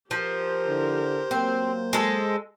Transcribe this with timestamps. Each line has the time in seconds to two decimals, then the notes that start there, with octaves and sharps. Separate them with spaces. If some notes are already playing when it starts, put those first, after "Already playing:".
0.11 F3 G4 A#4 C5
0.65 D3 E4
1.31 F#3 A#3 C4
1.93 G#3 A4